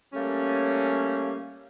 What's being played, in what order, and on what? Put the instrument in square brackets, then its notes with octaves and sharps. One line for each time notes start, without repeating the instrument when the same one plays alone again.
[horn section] G3 A3 A#3 C#4